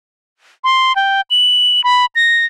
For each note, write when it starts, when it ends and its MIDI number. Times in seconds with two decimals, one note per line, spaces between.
0.64 0.95 84
0.96 1.21 79
1.30 1.83 102
1.84 2.06 83
2.15 2.45 94